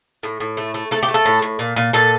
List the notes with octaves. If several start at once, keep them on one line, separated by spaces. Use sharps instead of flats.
A2
A2
A3
A3
A3 A4
G4
A3
A4
A2
A2
A#2
A#2
A#2 A4